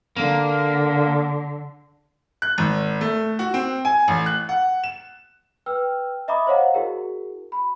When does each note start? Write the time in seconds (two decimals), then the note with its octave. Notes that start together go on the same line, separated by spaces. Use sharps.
0.16 D3 A#3
2.42 F#6
2.58 G#1
3.01 A3
3.39 F#4
3.54 C4
3.85 G#5
4.08 A1
4.26 F#6
4.49 F#5
4.84 E7
5.66 B4 G5 E6 F6
6.28 D#5 E5 A#5 B5 D6 D#6
6.47 C5 C#5 D#5 F5 F#5 A#5
6.74 E4 F#4 G#4 A#4
7.52 B5